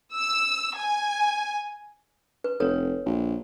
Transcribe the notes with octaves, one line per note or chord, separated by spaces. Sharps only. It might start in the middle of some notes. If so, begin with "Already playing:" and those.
E6
G#5
B4
F1 A4 B4 C#5
A#1